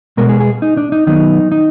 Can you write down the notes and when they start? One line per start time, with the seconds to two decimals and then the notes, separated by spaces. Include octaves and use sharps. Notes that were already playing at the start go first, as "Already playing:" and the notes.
0.17 B2 G#3 B3 A#4
0.29 G#4
0.40 G#4
0.62 D#4
0.77 D4
0.92 D#4
1.07 D#3 F#3 B3 D#4
1.52 D#4